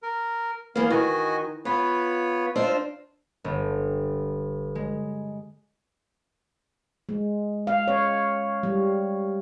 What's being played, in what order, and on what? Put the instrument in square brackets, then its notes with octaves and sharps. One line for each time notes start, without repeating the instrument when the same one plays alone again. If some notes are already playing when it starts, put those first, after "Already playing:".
[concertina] A#4
[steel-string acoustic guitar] E3 A#3 [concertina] B3 F5
[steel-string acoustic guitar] D#3 [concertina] F#4 D#5 G#5
[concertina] B3 B4 C#5 [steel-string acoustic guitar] F4
[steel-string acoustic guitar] D4 D#4 C5 [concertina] F4 A5 E6
[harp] G1
G#3
[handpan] G#3
F5
C#5
G3